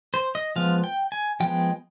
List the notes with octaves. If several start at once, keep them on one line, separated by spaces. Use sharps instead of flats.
C5
D#5
F3 G#3 B3 F5
G5
G#5
F3 G#3 B3 G5